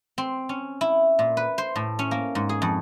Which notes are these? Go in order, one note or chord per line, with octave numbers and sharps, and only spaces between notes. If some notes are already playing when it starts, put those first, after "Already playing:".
C4
C#4
E4
A#2
B4
C5
A2
C#4
A#3
G#2
G#4
F2